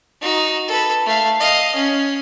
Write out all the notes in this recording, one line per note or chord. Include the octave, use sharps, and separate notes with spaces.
D#4 F#4
A4 B4
A3 F5
D#5 F5
C#4